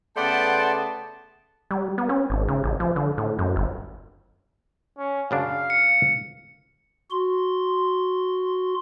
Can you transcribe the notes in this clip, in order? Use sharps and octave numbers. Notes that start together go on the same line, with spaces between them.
C#3 A3 B3 D5 F#5 G5 A5 C6
G3
B3
C#4
G#1
C#3
A1
F3
D3
A2
F#2
G1
C#4
F#2 C#3 D4 F5
C#7
F#4 C6